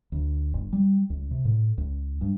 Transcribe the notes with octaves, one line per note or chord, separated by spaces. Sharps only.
D2
G1
G3
C#2
C3
A2
C#2
G2